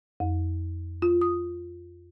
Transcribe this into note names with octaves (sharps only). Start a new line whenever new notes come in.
F2
F4
D#6